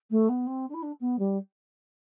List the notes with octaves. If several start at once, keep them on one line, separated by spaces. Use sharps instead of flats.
A3
B3
C4
D4
E4
D4
B3
G3